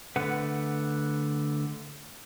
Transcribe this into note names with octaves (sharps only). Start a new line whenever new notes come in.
D3 A3 B4 F#5